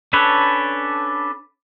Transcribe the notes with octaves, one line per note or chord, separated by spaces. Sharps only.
C#4 D4 A4 B4 C#5